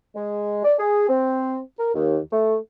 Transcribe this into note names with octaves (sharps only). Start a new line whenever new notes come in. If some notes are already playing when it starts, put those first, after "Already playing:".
G#3
D5
G#4
C4
A#4
D#2
A3